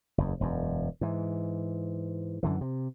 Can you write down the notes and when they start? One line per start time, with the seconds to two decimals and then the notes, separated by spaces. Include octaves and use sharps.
0.18 F#1 E2
0.41 E1 F#2
1.01 G#2 E3
2.43 F#2 D3 E3
2.61 C3